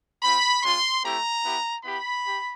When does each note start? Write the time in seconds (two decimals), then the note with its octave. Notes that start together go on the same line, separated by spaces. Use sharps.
0.22 C4 F4 B5
0.63 G#3 C#4 F4 C6
1.03 A3 C4 E4 G4 A#5
1.43 B3 E4 G4
1.84 B3 E4 G4 B5
2.25 G4